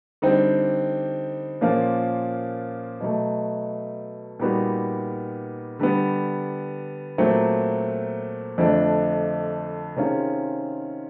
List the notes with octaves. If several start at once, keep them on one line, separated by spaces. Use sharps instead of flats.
D3 G3 C4 D#4
A#2 F3 A#3 C#4 F4
B2 F#3 A3
A#2 G3 B3 D#4 F#4
D3 G3 B3
A#2 F#3 A3 C4
F2 D3 F3 A3 D4
C3 D#3 G#3 C#4 F4